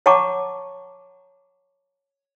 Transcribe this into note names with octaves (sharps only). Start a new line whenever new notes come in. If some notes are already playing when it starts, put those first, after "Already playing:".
C#5 F#5 A5 A#5 C#6 D6